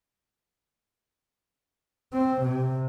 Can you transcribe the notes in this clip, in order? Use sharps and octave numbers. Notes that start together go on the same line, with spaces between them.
C4
C3